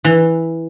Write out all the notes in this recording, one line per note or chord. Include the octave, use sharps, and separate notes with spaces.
E3